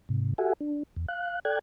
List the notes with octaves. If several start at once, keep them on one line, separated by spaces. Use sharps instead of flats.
G#2 C3
F#4 G4 A4 E5 F#5 G#5
D4
E2
F5 F#6
A4 D5 G5 F#6 G#6